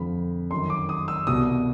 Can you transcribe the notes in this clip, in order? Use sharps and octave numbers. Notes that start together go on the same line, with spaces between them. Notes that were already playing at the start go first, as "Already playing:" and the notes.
Already playing: F2 D3 F3 B5
F#2 D#3 C6
D6
D#6
E6
C2 B2 D#6